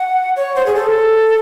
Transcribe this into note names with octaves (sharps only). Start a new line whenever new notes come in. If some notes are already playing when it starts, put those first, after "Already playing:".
Already playing: F#5
C#5
C5
G#4
A4